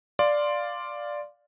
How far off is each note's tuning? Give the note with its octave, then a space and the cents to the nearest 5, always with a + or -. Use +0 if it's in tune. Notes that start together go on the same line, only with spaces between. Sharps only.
D5 +0 F5 +0 C6 +0